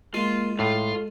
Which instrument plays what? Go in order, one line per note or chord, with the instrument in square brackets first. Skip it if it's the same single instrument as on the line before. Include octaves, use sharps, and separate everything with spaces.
[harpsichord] G#3 [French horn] A#3 [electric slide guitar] F4
[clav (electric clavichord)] A2 [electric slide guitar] F4 F5 [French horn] A4